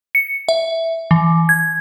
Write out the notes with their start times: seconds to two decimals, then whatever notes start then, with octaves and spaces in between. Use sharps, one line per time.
0.15 C#7
0.49 E5
1.11 E3
1.49 G#6